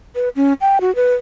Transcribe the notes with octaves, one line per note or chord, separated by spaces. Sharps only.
B4
C#4
G5
F#4
B4